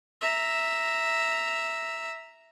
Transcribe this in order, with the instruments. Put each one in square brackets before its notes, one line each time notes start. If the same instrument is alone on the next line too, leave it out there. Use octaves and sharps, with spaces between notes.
[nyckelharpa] E5 A#5